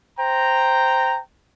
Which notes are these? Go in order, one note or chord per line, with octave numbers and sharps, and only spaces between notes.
C5 G5 A#5